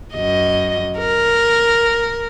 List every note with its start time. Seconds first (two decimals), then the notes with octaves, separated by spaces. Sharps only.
0.14 F#2 D#5
0.98 A#4